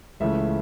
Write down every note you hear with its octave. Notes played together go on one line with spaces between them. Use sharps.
C#2 C#3 E3 A3 E5